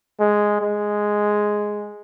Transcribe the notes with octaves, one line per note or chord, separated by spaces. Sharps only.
G#3
G#3